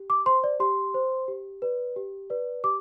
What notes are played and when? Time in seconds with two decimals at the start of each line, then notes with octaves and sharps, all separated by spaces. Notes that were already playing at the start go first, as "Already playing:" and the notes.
Already playing: G4
0.10 D6
0.26 C5 C6
0.44 D5
0.60 G4 C6
0.94 C5
1.28 G4
1.62 B4 D5
1.96 G4
2.30 B4 D5
2.64 G4 D6